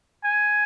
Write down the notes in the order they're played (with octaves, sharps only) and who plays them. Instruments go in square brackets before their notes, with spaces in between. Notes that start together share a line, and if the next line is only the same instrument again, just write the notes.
[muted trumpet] G#5